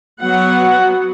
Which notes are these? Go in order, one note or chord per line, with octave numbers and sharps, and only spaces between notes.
F#3 B3 F#5